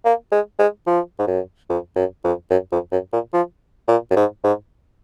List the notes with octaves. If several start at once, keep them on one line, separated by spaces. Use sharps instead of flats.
A#3
G#3
G#3
F3
G#2
F#2
F2
F#2
F2
F#2
F2
F#2
A#2
F3
A#2
F#2
G#2
G#2